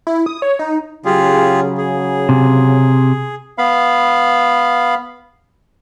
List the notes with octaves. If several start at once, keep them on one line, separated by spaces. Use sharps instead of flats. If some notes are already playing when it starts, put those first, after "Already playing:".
E4
D#6
C#5
D#4
C#3 F#3 F4 G4 G#4
G#4
C3
B3 F5 B5